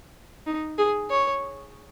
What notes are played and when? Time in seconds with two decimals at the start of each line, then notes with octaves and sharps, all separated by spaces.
0.47 D#4
0.78 G#4
1.10 C#5